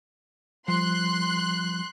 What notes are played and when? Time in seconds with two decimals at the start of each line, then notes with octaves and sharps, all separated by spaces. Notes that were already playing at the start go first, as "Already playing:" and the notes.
0.68 F3 G3 C6 F#6 C7